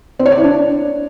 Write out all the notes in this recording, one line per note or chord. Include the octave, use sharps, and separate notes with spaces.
C4
C#5
D5
E4
D4